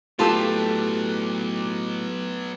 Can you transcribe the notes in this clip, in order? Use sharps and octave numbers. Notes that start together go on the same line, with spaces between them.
A2 F#3 B3 F4 G4 A4 A5